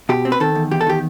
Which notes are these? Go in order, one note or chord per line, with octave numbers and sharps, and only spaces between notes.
B2 G4
C4
B4
D#3 A4
E2
E2 G4
A4
D#3 G4